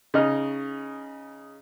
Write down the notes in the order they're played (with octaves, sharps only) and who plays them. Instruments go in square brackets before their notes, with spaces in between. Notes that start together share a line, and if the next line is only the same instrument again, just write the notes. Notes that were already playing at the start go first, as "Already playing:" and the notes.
[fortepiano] C#3 D#4 D#5 F6